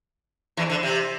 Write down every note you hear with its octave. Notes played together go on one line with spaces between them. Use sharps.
E2 E3
D3
C3